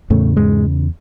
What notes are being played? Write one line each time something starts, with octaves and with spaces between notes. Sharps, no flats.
E2 A2 C#3 A3
G#2 G#3